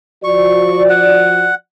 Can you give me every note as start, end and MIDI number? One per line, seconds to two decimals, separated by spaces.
0.24 1.50 53
0.24 1.50 66
0.24 1.50 74
0.24 0.83 85
0.90 1.55 78